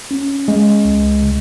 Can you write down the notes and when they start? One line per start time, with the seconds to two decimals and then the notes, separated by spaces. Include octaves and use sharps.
0.11 C#4
0.48 G#3
0.85 C#2
1.23 C#3